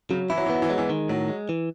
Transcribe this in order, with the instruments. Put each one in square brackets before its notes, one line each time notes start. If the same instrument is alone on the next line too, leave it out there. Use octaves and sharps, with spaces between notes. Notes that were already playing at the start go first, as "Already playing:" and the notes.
[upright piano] C#3 [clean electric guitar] F#3
[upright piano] E3 [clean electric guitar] E4
[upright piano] F#3
E3
[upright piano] F#3 [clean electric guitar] B3
[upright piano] E3
[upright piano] F#3 [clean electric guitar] G#3
[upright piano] E3
[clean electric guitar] D#3
[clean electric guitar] A2 [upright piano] F#3
[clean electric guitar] G#3
E3